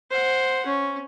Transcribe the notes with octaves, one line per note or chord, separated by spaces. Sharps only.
C5 F#5
C#4